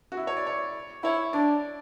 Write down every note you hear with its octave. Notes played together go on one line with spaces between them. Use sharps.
F#4
E4
C#5
D5
C#5
E4 C#5
D4 D5